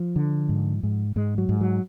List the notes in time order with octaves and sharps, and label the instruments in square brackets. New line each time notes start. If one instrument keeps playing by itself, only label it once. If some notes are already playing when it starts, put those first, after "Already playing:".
Already playing: [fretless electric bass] F3
D3
G#2
G#2
G#2 G#3
F#3
G#2
F#3